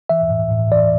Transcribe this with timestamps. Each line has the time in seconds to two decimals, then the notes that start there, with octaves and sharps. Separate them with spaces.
0.09 E3 E5
0.30 A2
0.51 A2
0.72 E3 D5